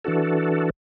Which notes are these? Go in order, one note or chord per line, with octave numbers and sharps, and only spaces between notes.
E3 D4 F#4 A4